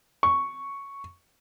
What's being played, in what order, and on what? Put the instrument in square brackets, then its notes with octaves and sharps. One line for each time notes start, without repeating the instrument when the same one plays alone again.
[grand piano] C#6